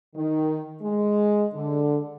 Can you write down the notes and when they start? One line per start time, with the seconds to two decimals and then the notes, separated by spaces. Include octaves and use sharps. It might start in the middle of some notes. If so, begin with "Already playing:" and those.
0.15 D#3
0.81 G#3
1.53 D3